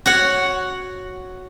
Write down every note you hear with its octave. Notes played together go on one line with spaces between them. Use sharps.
F#4 C#5 F#5